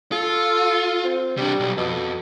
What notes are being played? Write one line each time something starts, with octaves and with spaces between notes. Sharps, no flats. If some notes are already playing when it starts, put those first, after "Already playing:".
F4 A4
C4
C3 G3 D4
B1
F2 B2